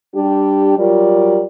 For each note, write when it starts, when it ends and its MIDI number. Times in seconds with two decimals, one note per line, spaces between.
0.15 0.77 55
0.15 0.77 62
0.15 0.77 67
0.78 1.43 54
0.78 1.43 55
0.78 1.43 65
0.78 1.43 70
0.78 1.43 74